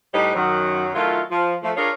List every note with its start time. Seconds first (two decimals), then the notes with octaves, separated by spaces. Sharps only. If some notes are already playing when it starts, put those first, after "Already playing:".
0.13 A2 G3 D#4 B4 C#5 D#5
0.34 F#2 D#3 F#3
0.94 D#3 F#3 A3 E4 F4
1.30 F3
1.62 F3 A3
1.76 D4 F4 G#4 A#4 C#5